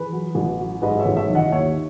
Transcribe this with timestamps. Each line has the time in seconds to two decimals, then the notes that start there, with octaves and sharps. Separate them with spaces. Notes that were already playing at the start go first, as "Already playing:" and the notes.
Already playing: E3 G#4 B4
0.12 F#3
0.35 A1
0.59 F#3
0.82 G#2 B4 D#5
0.99 C#5 E5
1.06 A1
1.17 C#5 E5
1.30 D#3
1.35 D#5 F#5
1.52 D#2 C#5 E5